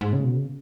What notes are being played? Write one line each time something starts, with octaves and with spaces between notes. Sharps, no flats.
G#2
C#3
B2
C#3